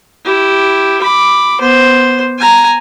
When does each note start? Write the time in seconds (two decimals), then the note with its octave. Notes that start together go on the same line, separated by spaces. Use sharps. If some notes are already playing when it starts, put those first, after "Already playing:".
0.25 E4 G4
1.02 B5 D6
1.61 B3 C5
2.38 G#5 A#5